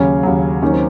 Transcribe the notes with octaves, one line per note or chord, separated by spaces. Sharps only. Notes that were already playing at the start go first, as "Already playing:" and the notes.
Already playing: D#2 C#3 F#3 C#4
D#2 C#3 F#3
D#2 D#3 F#3 C#4
C4